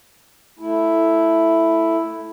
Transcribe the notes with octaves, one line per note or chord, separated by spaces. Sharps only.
A3 E4